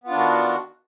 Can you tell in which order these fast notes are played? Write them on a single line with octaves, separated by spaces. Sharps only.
B3 F4 D4 D#3 F#4